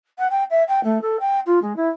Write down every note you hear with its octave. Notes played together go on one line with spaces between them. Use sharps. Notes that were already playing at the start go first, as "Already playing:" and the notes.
F#5
G5
E5
G5
A3
A4
G5
F4
G#3
E4